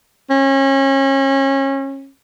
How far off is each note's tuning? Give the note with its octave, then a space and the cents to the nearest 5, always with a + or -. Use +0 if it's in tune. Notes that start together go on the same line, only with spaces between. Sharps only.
C#4 -30